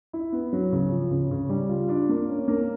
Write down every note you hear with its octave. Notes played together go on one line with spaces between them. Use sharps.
E4
B3
F#3
C#3
F3
C#3
C#3
G3
F4
D4
A#3
C#4
A#3